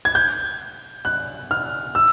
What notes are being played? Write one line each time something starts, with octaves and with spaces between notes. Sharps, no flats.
G#6
G6
F#6
F6
E6